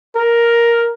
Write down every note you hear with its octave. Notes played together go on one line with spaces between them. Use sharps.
A#4